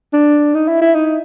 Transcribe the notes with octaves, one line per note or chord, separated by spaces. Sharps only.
D4
D#4
E4
E4
D#4